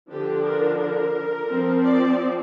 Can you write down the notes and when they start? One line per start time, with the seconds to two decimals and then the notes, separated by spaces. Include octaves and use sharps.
0.11 D3 F3 D4 G4
0.46 A#4
0.80 A#4
1.50 F3 C4
1.84 D5